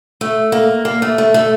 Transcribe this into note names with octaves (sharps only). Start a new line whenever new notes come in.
A3
A#3
A#3
A3
A3
A3